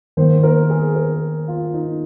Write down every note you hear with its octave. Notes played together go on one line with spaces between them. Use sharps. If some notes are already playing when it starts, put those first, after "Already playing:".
D#3 A#3 C5
A#4
G#4
A#4
F4
D#4